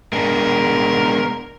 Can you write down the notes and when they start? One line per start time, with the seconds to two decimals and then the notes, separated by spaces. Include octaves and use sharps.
0.13 G#3 B3 D4 A#4